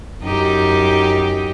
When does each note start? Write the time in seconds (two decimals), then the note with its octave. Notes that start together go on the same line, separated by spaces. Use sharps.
0.23 F#2 D#4 G4